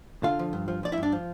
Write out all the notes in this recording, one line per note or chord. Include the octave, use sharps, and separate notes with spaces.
D3 F4 F5
F3
G2
F3
F3 D5
E4 E5
G2
D4 D5
F3